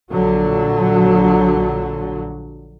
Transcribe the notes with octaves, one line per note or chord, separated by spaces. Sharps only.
A#1 D3 F#3